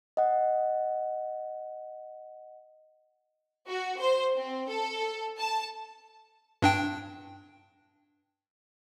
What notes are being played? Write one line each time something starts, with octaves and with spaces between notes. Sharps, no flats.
D#5 F#5
F#4
C5
C4
A4
A5
G2 D4 G5